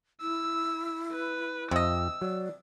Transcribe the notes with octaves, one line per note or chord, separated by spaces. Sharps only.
E4 E6
B4
F2 C3 D#5 E6
F#3 D5